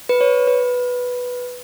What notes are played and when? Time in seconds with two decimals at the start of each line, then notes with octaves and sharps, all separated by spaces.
0.09 B4
0.21 C#5
0.48 B4